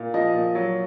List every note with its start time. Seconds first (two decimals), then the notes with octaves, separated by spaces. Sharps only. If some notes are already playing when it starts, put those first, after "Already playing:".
Already playing: A#2
0.14 F3 D#5
0.34 A#2
0.55 F#3